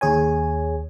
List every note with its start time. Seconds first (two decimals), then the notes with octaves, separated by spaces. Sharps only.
0.01 D#2 G#4 C#5 G#5